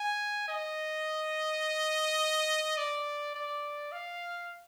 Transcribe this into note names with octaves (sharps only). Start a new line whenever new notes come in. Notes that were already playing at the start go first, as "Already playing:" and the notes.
Already playing: G#5
D#5
D5
D5
F5